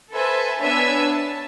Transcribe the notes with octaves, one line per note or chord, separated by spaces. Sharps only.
A4 B4 C5 E5 G#5 A5
B3 D4 C#5 E5 G#5 E6
A5